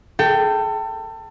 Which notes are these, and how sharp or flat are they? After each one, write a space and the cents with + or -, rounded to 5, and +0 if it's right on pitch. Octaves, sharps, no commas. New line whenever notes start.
A4 +25 G5 -5